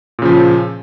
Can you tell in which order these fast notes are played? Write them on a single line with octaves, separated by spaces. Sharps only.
A#2 C#3 F3